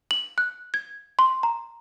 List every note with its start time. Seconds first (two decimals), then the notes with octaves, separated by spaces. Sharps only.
0.11 F#7
0.38 F#6
0.74 G#6
1.19 C6
1.43 A#5